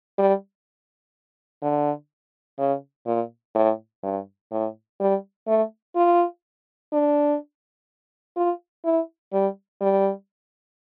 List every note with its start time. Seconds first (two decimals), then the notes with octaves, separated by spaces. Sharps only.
0.18 G3
1.62 D3
2.59 C#3
3.07 A#2
3.55 A2
4.03 G2
4.51 A2
5.00 G3
5.48 A3
5.96 F4
6.93 D4
8.36 F4
8.85 E4
9.33 G3
9.81 G3